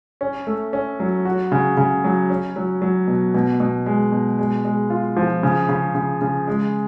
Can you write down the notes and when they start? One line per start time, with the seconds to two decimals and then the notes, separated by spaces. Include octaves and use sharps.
0.21 C#4
0.47 A3
0.73 C#4
1.00 F#3
1.25 F#4
1.52 C#3
1.77 C#3
2.04 F#3
2.30 C#4
2.56 F#3
2.82 F#3
3.08 B2
3.34 B2
3.60 B2
3.86 G#3
4.12 B2
4.39 G#3
4.65 G#3
4.90 F4
5.17 F3
5.43 C#3
5.69 C#3
5.95 C#3
6.22 C#3
6.48 G#3